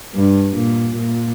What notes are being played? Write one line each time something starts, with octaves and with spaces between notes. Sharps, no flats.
G2
A#2
A#2